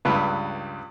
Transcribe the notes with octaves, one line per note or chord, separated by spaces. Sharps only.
C#2 G2 B4